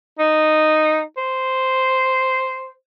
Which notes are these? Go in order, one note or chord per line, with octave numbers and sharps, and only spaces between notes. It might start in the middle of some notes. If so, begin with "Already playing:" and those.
D#4
C5